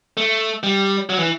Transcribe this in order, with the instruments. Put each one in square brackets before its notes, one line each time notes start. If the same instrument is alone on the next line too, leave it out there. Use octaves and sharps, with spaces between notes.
[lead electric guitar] A3
G3
F#3
E3